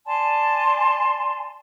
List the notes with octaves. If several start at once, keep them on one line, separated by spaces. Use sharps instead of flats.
D5 G#5 A5 C6